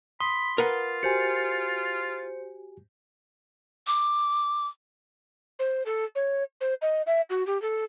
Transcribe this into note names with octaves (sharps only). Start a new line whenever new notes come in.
B5 C6 D#6
F4 A#4 B4 F#5
F#4 G4 C5 G#5 C#7
D6
C5
A4
C#5
C5
D#5
E5
F#4
G4
A4